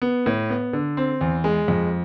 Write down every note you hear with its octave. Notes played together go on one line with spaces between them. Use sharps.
B3
A2
B3
D3
C4
E2
G#3
F2